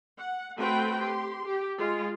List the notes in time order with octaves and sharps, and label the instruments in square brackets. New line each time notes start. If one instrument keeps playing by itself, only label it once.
[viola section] F#5
A3 C4 F#4 B4 G5 B5
G4 C6
G4
G#3 F4